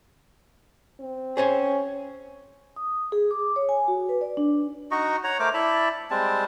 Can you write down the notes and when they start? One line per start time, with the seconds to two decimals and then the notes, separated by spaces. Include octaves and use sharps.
1.00 C4
1.37 C#4 G#4 C5 G#5
2.76 D#6
3.12 G#4
3.31 D6
3.56 C#5
3.69 G#5
3.88 F#4
4.09 B4
4.21 D5
4.37 D4
4.91 D#4 F#4 D#5 C#6
5.24 C#5 F#5 A#5
5.39 A3 A#4 C5 D6
5.54 E4 D5 A5 B5
6.11 G3 G#3 C4 A5